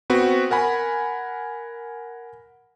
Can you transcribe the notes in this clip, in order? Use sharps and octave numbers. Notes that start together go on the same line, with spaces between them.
B3 C4 F#4 B4
A#4 F#5 G#5 B5